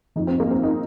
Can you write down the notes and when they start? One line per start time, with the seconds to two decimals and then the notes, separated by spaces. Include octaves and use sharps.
0.16 F2 D#3 D#4
0.27 C4
0.40 A#3
0.50 C4
0.63 D#4